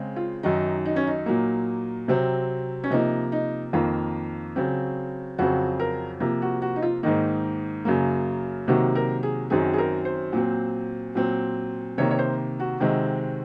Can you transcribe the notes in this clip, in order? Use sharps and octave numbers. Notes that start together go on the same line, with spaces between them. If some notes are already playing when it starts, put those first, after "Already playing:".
Already playing: C#3 G#3 C4
F4
F#2 D#3 F#3 D#4
D#4
C#4
D#4
A#2 F#3 A#3
C3 F#3 C4
C#4
C3 F3 A#3 D#4
D#4
F2 D#3 A#3 F4
C#3 F#3 C4
F2 C#3 F#3 C4 F#4
A#4
C3 F3 A#3
F#4
F#4
D#4
F4
G#2 D#3 A#3 D#4
F#2 C#3 F#3 A#3
C3 D#3 F#3 A#3 F#4
A#4
G#4
F#2 D#3 F#3 C4 G#4
G#4
A#4
C5
A#2 F#3 C4
A#2 F#3 C4
C3 D#3 A#3 C#5
C#5
C5
F#4
C3 D#3 G#3 C4